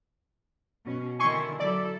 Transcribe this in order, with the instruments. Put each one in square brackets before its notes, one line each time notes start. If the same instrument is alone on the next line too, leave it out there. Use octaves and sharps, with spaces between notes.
[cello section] B2 C#4
[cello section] D3 D#3 E4 [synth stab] G#5 C6 C#6
[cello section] F#3 E4 A4 [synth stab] D5